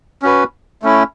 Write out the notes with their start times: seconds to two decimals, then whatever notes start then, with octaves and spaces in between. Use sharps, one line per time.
0.22 C#4 F#4 B4
0.82 A3 C#4 E4